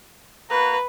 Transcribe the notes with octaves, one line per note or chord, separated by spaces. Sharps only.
A#3 F#4 B4 A#5